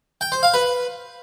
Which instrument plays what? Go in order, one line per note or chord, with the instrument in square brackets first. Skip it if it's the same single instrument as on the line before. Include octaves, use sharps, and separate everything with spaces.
[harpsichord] G5
C5
F5
B4